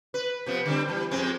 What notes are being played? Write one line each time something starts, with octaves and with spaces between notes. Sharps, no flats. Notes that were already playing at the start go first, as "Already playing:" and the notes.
B4
C3 F3 B3
D3 G3 C4
E3 G3
F2 G#3 C4